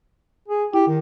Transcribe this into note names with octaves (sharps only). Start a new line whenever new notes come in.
G#4
E4 G4
D#3